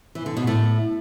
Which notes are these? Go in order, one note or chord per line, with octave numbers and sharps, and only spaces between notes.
E3
D3
B2
A2